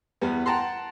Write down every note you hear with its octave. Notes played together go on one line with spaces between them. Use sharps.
E2 G3 B3
F#5 G5 A5 A#5 C6